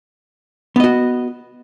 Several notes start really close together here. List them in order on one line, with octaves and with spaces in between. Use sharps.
B3 D#5 F#4